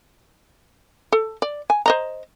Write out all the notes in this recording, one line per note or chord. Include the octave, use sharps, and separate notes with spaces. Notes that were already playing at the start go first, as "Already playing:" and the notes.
A4
D5
G#5
C5 D#5 A#5